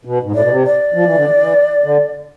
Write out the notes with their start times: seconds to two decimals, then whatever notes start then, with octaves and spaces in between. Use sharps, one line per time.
0.05 B2
0.23 G#2
0.32 A2 D5
0.41 B2
0.50 C3
0.65 D5
0.94 F3
1.05 E3
1.15 D3
1.26 E3
1.40 E3
1.84 D3